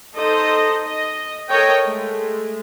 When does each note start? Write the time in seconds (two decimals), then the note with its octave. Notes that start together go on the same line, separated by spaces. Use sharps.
0.16 D#4 A4 C5 D#5
0.83 D#5
1.49 A4 A#4 C#5 D#5 G5
1.86 G#3 A3